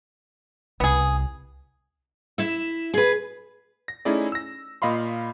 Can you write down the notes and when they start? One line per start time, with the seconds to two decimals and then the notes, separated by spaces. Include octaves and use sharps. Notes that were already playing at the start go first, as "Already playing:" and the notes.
0.80 C2 B3 G#4
2.38 E4 E5
2.94 G#4 B4
3.88 A#6
4.05 A3 C#4 D#4 E4 G#4 D5
4.32 E6 A#6
4.82 A#2 D#5 F5 B5 C6